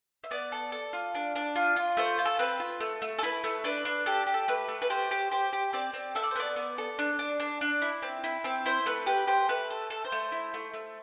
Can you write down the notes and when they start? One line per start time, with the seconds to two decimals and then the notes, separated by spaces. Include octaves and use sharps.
0.24 E5
0.31 B3 D5
0.52 A4
0.72 A4
0.93 F4
1.15 D4
1.35 D4
1.56 F4
1.76 F4
1.97 A3 C5
2.18 F4
2.25 A4
2.39 C4 B4
2.60 F4
2.81 A3
3.02 A3
3.19 A4
3.23 E4 B4
3.44 A3
3.64 D4 B4
3.85 D4
4.06 G4 A4
4.27 G4
4.34 A4
4.48 A3 B4
4.68 A3
4.82 B4
4.90 G4 C5
5.11 G4
5.31 G4 C5
5.53 G4
5.73 C4 D5
5.94 C4
6.15 A4 E5
6.23 D5
6.31 C5
6.36 B3 D5
6.56 B3
6.78 A4
6.99 D4
7.19 D4
7.40 D4
7.61 D4
7.82 E4
8.02 C4
8.24 E4
8.44 C4
8.66 E4 C5
8.86 A3 B4
9.06 G4 B4
9.27 G4 C5
9.49 A3 B4
9.70 A4
9.90 A4
10.05 C5
10.12 A3
10.32 E4
10.54 A3
10.74 A3